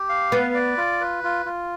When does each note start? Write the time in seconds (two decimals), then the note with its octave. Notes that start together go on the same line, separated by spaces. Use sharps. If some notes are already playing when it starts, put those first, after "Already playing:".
Already playing: G4
0.09 F5
0.32 B3 B4
0.54 D5
0.77 F4
1.01 B4
1.24 F4
1.46 F4